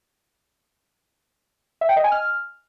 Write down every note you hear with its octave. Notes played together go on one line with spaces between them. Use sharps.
E5
G5
D#5
G#5
F6